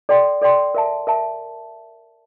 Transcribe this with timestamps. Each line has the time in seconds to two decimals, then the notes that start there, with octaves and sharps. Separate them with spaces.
0.09 A4 D5 G5 C6
0.41 A4 D5 G5 C6
0.75 A#4 E5 A5
1.07 A#4 E5 A5